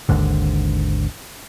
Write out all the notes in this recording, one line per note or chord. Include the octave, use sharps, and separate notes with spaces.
G#1 D#2 G#2 D3